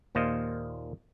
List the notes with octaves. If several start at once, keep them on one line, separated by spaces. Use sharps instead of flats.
D#2 A#2 F4 C5 D#5 F5